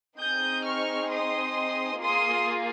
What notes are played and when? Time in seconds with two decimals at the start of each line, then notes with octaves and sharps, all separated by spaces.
0.19 C4 D#4 G#4 D#6 G6
0.64 C#6 F6
1.10 C6 D#6
2.02 A#3 F4 G#4 C6 D#6